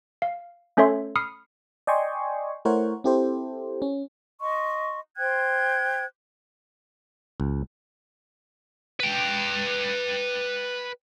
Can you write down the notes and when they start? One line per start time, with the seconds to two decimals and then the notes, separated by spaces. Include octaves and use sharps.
0.22 F5
0.77 A3 C#4 A4 C#5 E5 C6
1.16 B5 D#6 F6 C7 C#7
1.87 D5 D#5 G5 G#5 C6 C#6
2.65 A3 E4 A#4 C5 C#5 F#5
3.04 C4 E4 G4 A4 C5
3.82 C#4
4.41 D#5 C6 C#6
5.17 C5 G5 F#6 G#6
7.40 C#2
9.00 B4 G5